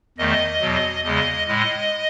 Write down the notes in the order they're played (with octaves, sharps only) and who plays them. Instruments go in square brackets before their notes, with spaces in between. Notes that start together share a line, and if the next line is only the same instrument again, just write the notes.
[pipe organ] E2 D#3 A3 D#5
E2 B2 F#3
E2 C#3 G#3 D#5
A2 G#3 D#5